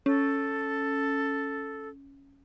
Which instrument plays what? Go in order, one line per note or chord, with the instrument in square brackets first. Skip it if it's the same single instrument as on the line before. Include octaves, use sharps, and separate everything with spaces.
[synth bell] C#4 [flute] A4